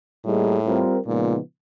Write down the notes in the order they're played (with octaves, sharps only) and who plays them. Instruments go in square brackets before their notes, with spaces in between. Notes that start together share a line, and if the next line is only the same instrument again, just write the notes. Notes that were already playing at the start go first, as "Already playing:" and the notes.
[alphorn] A2 [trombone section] G3 A#3 D#4 G#4
[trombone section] G3 C4 F4 A#4
[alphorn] A#2 [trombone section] C#3 F3 G#3 B3 D#4